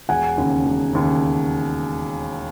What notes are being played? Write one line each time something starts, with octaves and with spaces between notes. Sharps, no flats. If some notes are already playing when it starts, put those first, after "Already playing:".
E1 F#5 G#5
D#2 C#3
E1
D#2 C#3